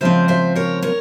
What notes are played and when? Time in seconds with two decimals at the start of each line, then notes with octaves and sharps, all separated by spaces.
0.01 C#3 F3 G#3 C4 C5 E5
0.28 C5 E5
0.55 A#4 C#5
0.82 A#4 C#5